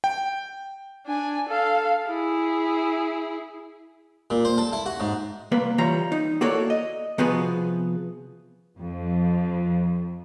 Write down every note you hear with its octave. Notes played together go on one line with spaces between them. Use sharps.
G5
D4 G#5
A4 F5
E4 G#4
A#2
C5
A4
E4
F#4
G#2
C2 A#3 B4
E3 G3 F4 C#5 A#5
D#4
A#3 E4 F#4 A4 C#5 D5
D#5
C3 F3 B3 F#4 G#4 B4
F2